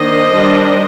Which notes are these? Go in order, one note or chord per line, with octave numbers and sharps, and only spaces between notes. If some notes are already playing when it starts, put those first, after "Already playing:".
Already playing: D#3 A#3 D4 C5 D#5
D#3 G3 D4